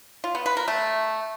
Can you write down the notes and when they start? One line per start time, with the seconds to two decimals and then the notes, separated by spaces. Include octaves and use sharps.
0.24 F4
0.35 B3
0.46 B4
0.57 A#4
0.68 A3